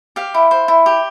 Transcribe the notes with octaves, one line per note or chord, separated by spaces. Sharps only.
G4 F5
E4
C5
E4
G4